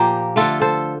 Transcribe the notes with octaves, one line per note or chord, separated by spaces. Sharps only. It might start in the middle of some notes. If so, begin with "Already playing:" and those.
Already playing: A#2 F3 A#3 G4 A#4
D3 A3 F4 A4
A4 C5